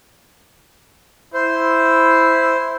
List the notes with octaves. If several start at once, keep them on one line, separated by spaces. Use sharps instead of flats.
E4 C5